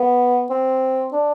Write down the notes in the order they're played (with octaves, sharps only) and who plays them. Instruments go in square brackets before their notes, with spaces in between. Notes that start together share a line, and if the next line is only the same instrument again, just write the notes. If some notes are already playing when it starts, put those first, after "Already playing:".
Already playing: [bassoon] B3
C4
D4